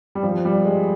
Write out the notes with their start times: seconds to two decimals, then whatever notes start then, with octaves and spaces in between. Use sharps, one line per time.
0.15 G3
0.23 F3
0.45 G3
0.65 G#3